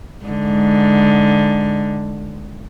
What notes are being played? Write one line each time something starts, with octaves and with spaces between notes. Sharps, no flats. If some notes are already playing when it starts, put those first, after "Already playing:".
G#2 D3